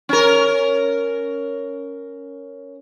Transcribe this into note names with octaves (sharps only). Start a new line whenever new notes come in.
C#4 A#4